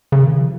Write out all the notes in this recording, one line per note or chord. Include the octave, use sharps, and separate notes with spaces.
C#3
D#3
F3